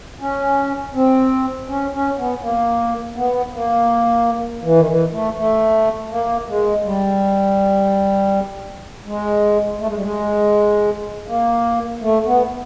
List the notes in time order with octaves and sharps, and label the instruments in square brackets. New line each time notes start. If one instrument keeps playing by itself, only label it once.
[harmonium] C#4
C4
C#4
C#4
B3
A#3
B3
A#3
E3
D#3
E3
A3
A3
A#3
G#3
G3
G#3
A3
G#3
G3
G#3
A#3
A3
B3